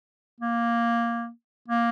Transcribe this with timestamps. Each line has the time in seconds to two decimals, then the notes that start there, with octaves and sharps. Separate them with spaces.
0.40 A#3
1.68 A#3